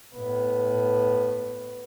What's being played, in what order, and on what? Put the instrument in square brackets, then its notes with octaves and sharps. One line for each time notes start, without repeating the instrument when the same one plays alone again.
[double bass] A2 B3